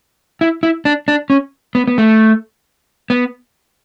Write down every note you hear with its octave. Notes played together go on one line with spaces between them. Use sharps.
E4
E4
D4
D4
C#4
B3
B3
A3
B3